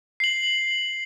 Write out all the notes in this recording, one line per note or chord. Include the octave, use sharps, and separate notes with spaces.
C7 F#7